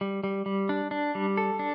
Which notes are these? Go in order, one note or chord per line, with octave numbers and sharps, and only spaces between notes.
G3
G3
G3
D4
D4
G3
A4
D4